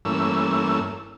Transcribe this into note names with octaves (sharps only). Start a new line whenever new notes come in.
G2 E3 A3 A#3 C#4 E6